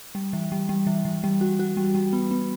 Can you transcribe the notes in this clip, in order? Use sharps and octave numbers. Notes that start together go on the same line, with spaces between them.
G3
E3
G3
G3
E3
E3
G3
F#4
F#4
G3
G3
B3
B3